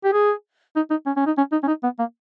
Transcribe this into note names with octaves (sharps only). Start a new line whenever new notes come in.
G4
G#4
D#4
D#4
C#4
C#4
D#4
C#4
D#4
C#4
D#4
B3
A#3